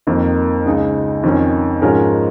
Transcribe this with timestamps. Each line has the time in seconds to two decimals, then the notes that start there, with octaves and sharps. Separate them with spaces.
0.07 F2 D#3 A#3
0.65 C#2 C#3 G#3 D#4
1.23 F2 D#3 C#4
1.82 G#2 F3 G#3 C#4 A#4